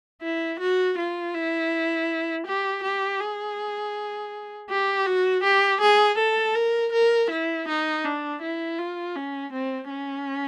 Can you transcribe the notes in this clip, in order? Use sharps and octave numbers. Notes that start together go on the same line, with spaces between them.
E4
F#4
F4
E4
G4
G4
G#4
G4
F#4
G4
G#4
A4
A#4
A#4
E4
D#4
D4
E4
F4
C#4
C4
C#4